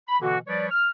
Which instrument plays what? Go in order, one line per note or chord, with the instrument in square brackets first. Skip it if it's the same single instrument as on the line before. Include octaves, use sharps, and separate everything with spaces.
[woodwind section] B5
B2 D3 E3 A#3 F#4
F3 G3 B4 C#5 D5
F6